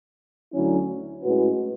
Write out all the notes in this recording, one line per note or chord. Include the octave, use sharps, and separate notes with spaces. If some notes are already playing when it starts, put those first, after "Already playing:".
D2 D3 F#3 C#4 E4
A2 G#3 C#4 F#4 B4